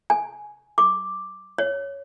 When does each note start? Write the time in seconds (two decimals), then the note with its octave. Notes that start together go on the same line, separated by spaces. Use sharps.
0.10 G#5
0.78 D6
1.58 C#5